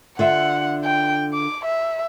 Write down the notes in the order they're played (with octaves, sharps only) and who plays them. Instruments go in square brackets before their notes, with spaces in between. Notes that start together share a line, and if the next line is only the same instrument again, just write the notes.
[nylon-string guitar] D3 F4 E5 [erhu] F#5
[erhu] G5
D6
E5